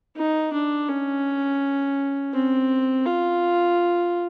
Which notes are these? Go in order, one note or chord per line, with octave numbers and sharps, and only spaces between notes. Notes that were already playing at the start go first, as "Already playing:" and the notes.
D#4
D4
C#4
C4
F4